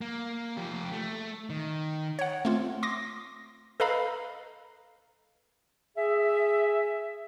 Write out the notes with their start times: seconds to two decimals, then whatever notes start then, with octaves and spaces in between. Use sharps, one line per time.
0.01 A#3
0.57 F3 G4
0.92 A3
1.50 D#3
2.19 C#5 F#5
2.45 A3 C4 F4
2.83 C6 D6 D#6 A#6
3.80 A4 B4 D#5 F5 A#5 B5
5.96 G#4 E5